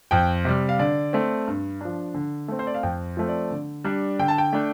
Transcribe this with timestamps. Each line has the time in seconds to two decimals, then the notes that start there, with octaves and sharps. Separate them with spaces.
0.11 F2 G5
0.45 C3 G3
0.69 F5
0.79 D3 D5
1.13 A3 C4
1.47 G2
1.81 F3 D4
2.14 D3
2.48 A3 C4
2.59 C5
2.67 D5
2.74 F5
2.83 F2 G5
3.17 F3 A3 C4
3.28 D5
3.51 D3
3.84 G3 D4
4.19 D3 G5
4.28 A5
4.38 G5
4.53 A3 D4